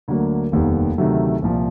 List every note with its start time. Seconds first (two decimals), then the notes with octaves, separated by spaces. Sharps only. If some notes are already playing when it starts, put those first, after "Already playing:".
0.08 D2 D3 F#3 A#3
0.52 F1 D#2 D#3 G3 B3
0.98 D2 C3 D#3 F#3 A3
1.42 C2 A#2 F3